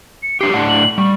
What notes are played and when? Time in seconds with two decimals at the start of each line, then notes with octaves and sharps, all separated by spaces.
0.23 C#7
0.41 F#3 D4 G4 C7
0.53 A2 D4 F#5
0.68 F#7
0.98 G3 C#6